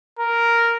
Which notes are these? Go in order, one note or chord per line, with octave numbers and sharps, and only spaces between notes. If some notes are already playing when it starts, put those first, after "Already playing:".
A#4